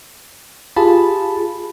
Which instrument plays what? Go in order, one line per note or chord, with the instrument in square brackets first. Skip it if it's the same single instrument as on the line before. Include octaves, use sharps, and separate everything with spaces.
[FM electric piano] F4 G#4 [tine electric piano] G4 A5 B5